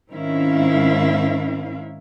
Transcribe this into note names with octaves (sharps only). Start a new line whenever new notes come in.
G#2 D#3 C4 C#4 E4 F5